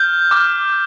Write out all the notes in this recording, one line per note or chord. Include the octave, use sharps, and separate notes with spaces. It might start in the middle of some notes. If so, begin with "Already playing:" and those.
Already playing: F6 G6
D6 F6